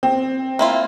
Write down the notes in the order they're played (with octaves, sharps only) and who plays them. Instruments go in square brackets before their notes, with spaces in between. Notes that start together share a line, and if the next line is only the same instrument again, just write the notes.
[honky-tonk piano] C4
[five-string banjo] A#3 E4 F4